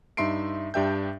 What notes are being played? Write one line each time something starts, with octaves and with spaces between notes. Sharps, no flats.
G2 D#4 E5 C6 C7 D7
G2 D4 G4 E5 G5 G6